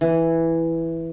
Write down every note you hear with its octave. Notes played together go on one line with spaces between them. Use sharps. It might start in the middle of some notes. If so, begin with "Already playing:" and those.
E3